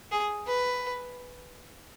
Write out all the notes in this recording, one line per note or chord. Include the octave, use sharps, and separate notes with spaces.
G#4
B4